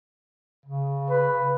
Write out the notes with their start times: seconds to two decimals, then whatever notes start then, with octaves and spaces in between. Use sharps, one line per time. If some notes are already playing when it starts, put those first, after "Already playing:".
0.66 C#3
1.10 B4